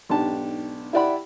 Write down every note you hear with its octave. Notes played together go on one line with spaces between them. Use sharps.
B1 G#2 D4 G4 A5
E4 G4 D5 F#5 B5